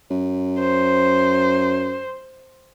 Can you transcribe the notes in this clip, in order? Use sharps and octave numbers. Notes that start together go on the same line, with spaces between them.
F#2
C5